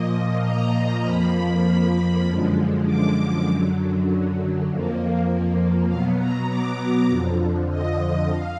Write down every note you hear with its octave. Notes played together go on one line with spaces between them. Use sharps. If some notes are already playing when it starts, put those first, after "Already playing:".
Already playing: A#2 F3 A#3 D#5
A#5
F2 F3 A#3 B5
B5
F#2 D3 F3 G#3
D6
F#2 D3 F#3
F2 F3 A#3
B2 F#3 B3 F5
A#5
D6
F2 D3 F3
D#5
F5